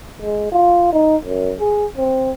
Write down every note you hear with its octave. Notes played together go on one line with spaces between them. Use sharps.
G#3
F4
D#4
F#2
G#4
C4